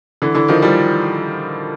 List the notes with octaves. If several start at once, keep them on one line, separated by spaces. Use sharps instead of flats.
D3 E3
D3 E3
D#3 F3
F3 G3